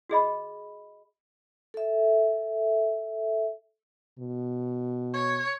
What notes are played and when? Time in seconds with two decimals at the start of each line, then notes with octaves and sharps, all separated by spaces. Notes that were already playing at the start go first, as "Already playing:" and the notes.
0.10 F#4 G#4 D#5 B5
1.74 A4 E5
4.19 B2
5.14 C#5